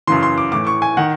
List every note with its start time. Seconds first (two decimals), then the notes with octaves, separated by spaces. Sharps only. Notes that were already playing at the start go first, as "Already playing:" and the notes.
0.07 F#2 C#3 E3 C6
0.23 C6
0.38 D6
0.52 A2 E3 D6
0.67 C#6
0.82 G#5
0.97 D#3 F#5